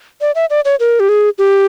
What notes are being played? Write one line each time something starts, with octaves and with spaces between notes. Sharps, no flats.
D5
E5
D5
C#5
A#4
G4
G#4
G4